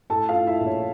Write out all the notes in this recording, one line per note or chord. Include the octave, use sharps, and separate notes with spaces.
A2 A4 A5
F4 F5
A2
E4 E5
A#1
C#5